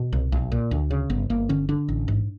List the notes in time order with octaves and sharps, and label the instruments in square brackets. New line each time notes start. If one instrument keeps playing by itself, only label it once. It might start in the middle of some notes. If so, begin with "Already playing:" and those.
Already playing: [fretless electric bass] B2
C2
B1
A#2
D2
C#3
G1 B3
G1 A#3
D3 C#4
D3 D4
A1
G#2